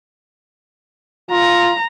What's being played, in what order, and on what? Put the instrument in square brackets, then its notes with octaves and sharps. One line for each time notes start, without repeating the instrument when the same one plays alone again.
[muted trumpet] F4 [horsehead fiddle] A#5